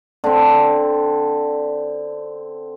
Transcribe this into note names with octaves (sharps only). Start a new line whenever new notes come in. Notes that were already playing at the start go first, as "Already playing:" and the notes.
D3 C4